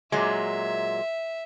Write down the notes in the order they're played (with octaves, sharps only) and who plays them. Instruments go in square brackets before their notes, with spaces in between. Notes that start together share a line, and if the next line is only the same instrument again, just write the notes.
[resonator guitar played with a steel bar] A#2 F#3 G#3 [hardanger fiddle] E5